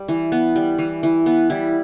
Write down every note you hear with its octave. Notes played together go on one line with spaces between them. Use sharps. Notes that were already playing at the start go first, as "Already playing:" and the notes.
Already playing: G3
E3
B3
G3
E3
E3
B3
G3 E4